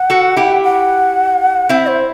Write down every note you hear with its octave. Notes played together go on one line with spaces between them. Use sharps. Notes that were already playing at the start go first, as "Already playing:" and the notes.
Already playing: F#5
F#4 A4
E4 G4
F#5
C4 E4 E5
C5